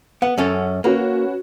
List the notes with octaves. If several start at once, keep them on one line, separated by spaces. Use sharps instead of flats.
B3 F#5
F#2 C#4 A4
A#3 C#4 F#4 B4